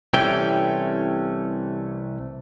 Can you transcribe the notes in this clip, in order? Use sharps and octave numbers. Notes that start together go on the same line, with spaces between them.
C2 C3 E3 A3 C#4 G5